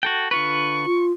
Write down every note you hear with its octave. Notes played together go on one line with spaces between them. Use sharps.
F#4 A4 G5
D3 F4 B4 C#6
F4